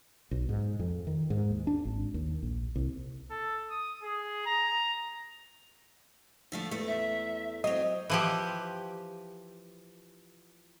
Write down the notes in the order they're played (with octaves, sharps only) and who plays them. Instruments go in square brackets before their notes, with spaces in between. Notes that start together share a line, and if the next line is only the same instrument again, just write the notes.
[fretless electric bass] B1
G#2
F2
D#3
G#2
D#2
D4
G#1
D#2
A#1
C2
[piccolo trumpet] A4
D#6
G#4
A#5
[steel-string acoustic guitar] D3 F3 A3
E2 A3
[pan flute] E5
[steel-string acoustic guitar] F#3 C4 [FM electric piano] D#5
[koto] E3 F3 G4